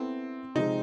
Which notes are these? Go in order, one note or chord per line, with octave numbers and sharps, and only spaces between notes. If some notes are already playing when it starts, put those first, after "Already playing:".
Already playing: B3 C4 E4 A4
C3 F3 G#3 D#4